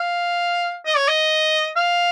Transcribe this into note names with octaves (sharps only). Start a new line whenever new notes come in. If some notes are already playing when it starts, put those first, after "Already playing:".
Already playing: F5
D#5
C#5
D#5
F5